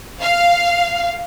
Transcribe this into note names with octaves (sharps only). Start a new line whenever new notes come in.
F5